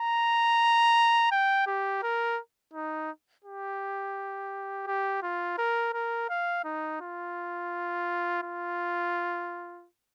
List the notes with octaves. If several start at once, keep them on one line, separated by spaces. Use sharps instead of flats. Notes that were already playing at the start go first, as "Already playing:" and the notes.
Already playing: A#5
G5
G4
A#4
D#4
G4
G4
F4
A#4
A#4
F5
D#4
F4
F4